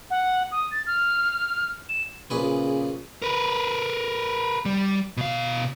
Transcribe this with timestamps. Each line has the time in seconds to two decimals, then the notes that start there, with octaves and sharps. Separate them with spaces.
0.10 F#5
0.52 D#6
0.71 A6
0.87 F6
1.89 E7
2.30 A#1 C#3 G#4 B4
3.22 A#4 B4
4.65 G3
5.17 B2 F5